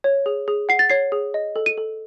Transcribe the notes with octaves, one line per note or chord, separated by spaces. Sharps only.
C#5
G#4
G#4
F#5 C7
A6
C#5 C7
G#4
D#5
A4
D#7
A4